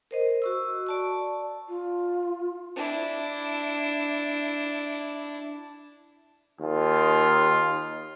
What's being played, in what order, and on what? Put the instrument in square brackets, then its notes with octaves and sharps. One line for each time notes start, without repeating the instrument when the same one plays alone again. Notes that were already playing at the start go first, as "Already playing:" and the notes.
[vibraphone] A#4 C5 D#5
F#4 C#6 E6
D5 A5 C#6
[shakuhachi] F4
[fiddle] D4 E4
[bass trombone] D#2 [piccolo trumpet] F4